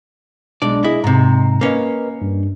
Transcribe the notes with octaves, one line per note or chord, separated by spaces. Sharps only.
B1 G#3 D4 D5
E4 G#4 D#5
G#2 C3 A#5
A#3 C#4 A#4 B4 D#5
G2